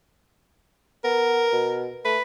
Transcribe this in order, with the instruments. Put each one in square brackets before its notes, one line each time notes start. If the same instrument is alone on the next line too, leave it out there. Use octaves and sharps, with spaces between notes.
[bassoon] B3 [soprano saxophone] A#4
[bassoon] B2
[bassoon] A3 [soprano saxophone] B4